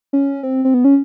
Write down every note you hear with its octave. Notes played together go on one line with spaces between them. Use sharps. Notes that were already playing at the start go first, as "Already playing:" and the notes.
C#4
C4
C4
B3
C#4